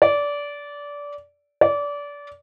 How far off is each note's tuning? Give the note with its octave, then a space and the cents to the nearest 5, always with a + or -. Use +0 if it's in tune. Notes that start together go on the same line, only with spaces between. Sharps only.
D5 -20
D5 -25